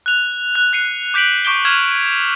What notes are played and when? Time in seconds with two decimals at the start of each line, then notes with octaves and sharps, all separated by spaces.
0.06 F#6 F7
0.55 F#6
0.73 F#6 C7 C#7 D#7
1.14 D6 G6 B6 D7 F#7
1.45 C#6 D6 G6 D7 G7
1.65 C#6 F6 G#6 E7 F7